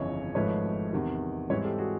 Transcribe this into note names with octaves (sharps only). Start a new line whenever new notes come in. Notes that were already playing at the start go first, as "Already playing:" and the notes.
Already playing: G1 F2 C#3 E3 C#5 D#5
G#1 G#2 F3 A3 B4 C#5
E2 C3 D#3
G#2 E3 G3 C4 B4 C#5
G4 A4
F#4 G#4